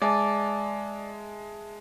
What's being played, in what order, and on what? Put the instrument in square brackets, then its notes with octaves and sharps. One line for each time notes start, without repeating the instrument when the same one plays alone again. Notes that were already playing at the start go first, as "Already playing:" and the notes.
[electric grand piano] G#3 [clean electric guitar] D5 [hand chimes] E5 G#5 A5